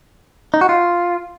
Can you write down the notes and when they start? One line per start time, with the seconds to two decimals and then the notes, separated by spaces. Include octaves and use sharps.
0.54 D#4
0.61 F#4
0.69 F4